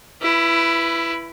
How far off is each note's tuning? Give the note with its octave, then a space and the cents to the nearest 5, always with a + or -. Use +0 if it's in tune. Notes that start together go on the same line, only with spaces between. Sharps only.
E4 +20 B4 +0